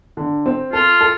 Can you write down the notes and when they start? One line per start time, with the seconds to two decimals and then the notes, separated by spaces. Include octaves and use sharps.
0.17 D3
0.46 C4
0.73 F4 A4
1.01 A4